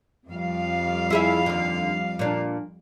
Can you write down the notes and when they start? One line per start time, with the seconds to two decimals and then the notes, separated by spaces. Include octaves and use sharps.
0.29 F2 G3 F5
1.10 E4 G#4 E5
1.46 D#2 D3
2.19 A#2 D4